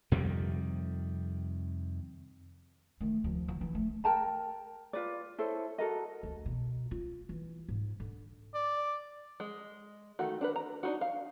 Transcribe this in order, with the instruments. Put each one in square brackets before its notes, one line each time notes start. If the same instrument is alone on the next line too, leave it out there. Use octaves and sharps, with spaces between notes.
[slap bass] F2 C3 D#3 G3
[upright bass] D#3 A3
D#2 F3
E3
E3
A3
[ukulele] A#4 G5 A5 A#5
F4 B4 D5
E4 A4 C5 C#5
F#4 A4 A#4 D#5
[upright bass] D2
B2
F4
E3
G#2
D3
[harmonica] D5
[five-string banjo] G#3
D#3 A3 F#4
D4 A#4 B4
A#5
D4 D#4 F#4
F5